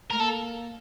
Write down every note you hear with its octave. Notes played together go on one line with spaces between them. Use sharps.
A3 A#4
A#3 A4